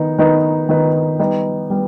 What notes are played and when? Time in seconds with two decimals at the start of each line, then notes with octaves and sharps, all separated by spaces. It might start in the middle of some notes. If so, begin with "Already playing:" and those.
Already playing: D#3 B3 D#4
0.18 D#3 B3 D#4 B4
0.69 D#3 B3 D#4 B4
1.19 G3 B3 D#4
1.70 G3 B3